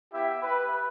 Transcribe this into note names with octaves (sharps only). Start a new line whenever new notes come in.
B3 E4 G4 E5
B4